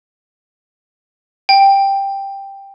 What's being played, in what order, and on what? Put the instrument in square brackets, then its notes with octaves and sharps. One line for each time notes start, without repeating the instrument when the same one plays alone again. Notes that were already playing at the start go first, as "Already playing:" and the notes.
[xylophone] G5